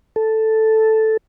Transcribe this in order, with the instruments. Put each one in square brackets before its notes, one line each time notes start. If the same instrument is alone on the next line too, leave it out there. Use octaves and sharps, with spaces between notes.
[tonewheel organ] A4